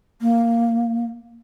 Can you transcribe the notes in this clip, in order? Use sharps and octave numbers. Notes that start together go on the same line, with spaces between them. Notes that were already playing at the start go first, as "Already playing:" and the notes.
A#3